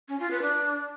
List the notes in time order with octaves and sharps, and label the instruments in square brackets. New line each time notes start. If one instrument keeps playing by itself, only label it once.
[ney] C#4
F4
B4
D4